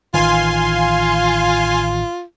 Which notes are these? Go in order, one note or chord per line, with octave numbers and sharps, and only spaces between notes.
A1 D#3 E3 F4 F5 G#5 C6